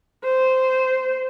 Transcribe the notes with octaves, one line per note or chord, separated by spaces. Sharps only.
C5